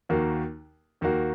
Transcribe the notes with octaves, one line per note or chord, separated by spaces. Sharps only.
D#2 D#3 A#3 F#4
D#2 D#3 A#3 F#4